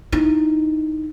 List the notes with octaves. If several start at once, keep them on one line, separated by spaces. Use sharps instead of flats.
D#4 E4